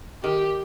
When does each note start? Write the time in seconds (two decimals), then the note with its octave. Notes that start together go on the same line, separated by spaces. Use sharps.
0.23 D#3 G4